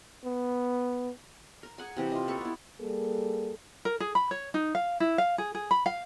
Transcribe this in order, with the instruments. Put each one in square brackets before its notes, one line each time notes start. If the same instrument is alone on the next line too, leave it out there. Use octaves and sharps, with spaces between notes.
[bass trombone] B3
[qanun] A#4
G#4 F#5 G#5
C3 E3 G4
F4 D#5
A#3 A4 B4 C#6
B3 E4
[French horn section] G3 A#3 G#4 A4
[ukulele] A#4
G#4
B5
C#5
D#4
F5
E4
F5
G#4
G#4
B5
F5